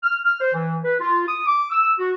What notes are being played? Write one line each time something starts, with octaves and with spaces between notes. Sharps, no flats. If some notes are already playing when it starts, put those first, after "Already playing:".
F6
F6
C5
E3
B4
F4
D#6
D6
E6
F#4